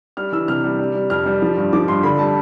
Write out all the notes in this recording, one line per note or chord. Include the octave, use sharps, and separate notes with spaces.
G3 F6
E3 E6
C3 F6
G3
G3
G3
F2 F6
G3
F3
G2
F3 D6
G2 C6
D3 B5
G3 A5